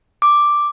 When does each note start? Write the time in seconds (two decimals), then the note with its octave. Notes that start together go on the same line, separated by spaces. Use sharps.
0.22 D6